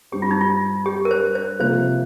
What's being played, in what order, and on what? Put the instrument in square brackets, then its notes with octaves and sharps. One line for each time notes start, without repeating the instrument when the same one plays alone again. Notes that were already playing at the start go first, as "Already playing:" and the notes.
[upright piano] G2 G3 C4 [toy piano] G4
[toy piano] F4
D#4
F4
G4
A#4
C5
C5
[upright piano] C3 F3 A#3 [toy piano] C5